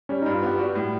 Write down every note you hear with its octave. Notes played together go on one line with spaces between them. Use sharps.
G3 C#4
G2 D#4
F4
B3 G4
G3 F#4
A2